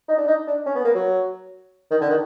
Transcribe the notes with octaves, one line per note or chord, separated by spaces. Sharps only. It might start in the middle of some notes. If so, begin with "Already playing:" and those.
D#4
D4
D#4
D4
C#4
B3
A#3
F#3
D#3
D3
D#3